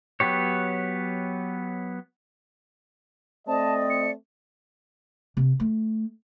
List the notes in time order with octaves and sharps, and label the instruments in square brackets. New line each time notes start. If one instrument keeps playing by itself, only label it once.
[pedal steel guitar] F#3 B3 G4 C#5
[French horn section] A3 C4 [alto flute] D5 [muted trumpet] D#5 [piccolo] A5
[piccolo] C#7
[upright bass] C3
A3